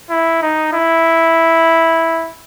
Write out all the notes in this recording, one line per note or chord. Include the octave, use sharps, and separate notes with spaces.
E4
D#4
E4